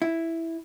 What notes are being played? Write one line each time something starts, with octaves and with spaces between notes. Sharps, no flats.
E4